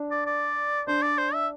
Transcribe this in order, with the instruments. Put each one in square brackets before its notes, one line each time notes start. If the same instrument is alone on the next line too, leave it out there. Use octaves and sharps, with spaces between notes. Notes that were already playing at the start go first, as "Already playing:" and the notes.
Already playing: [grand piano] D4
[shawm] D5
D5
[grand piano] D4 [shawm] C5
[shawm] D5
C5
E5